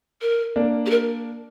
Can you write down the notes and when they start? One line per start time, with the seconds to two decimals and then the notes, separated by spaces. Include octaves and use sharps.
0.21 A#4
0.56 A#3 D4
0.86 G4
0.90 A#4